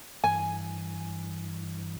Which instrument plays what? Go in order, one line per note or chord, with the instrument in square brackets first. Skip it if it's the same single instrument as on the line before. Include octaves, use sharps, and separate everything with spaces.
[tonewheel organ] G2 E3 [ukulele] G#5